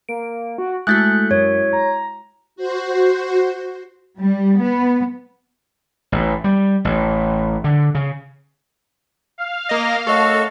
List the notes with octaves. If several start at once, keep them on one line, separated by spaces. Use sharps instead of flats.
A#3 D7
F#4
G#3 A3 E4 F#4 F#6 G6 A6
F#2 C#5
A#5
F#4 C5
G3
B3
A1
G3
A1
D3
C#3
F5
A#3 D#5 A#6
F#2 A3 F#4 A4 D#5 C#6